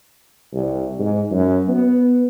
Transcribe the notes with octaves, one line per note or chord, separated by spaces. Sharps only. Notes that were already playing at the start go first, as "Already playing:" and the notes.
C2
G#2
F#2
B3